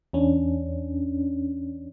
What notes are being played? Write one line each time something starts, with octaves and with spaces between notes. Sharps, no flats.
E2 C#4 D4